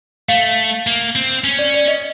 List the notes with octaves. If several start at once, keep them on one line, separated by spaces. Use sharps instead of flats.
A3 F5
A#3
C4
C#4
D5
D5
D#5